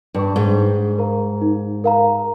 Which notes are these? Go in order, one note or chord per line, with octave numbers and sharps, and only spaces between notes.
G2 G5 C#6
G#2
D#4
A#4 F5 A#5
D#4
A#4 F5 A#5